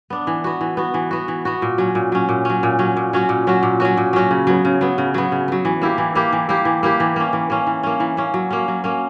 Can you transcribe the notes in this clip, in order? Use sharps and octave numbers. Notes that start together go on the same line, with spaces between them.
B3 D4
E3
B3 F#4
E3
B3 F#4
E3
B3 F#4
E3
B3 F#4
A#2
F#3 C#4
A#2
F#3 C#4
A#2
F#3 C#4
A#2
F#3 C#4
A#2
F#3 C#4 F#4
A#2
F#3 C#4 F#4
A#2
F#3 C#4 F#4
A#2
F#3 C#4 F#4
C#3
F#3 B3
C#3
F#3 B3
C#3
F#3 B3
C#3
F#3 B3
E3
A#3 E4 G4
E3
A#3 E4 G4
E3
A#3 E4 G4
E3
A#3 E4 G4
E3
A#3 C#4
E3
A#3 C#4
E3
A#3 C#4
E3
A#3 C#4
F#3
A#3 C#4
F#3
A#3 C#4